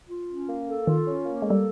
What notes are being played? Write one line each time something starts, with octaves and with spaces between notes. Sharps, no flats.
F4
C#4
A#3
A4
D#3 F4
C#4
A#3
G#3
G3 A4